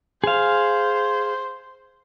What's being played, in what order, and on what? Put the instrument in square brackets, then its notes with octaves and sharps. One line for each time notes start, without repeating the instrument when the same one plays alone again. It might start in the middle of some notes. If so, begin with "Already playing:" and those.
[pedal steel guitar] G#4 F5 [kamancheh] C5